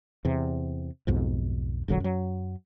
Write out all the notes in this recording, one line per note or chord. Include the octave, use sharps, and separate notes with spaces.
E2 C3
B1 F2 G#2
E1 A#1 D3 F#3
F#2 F#3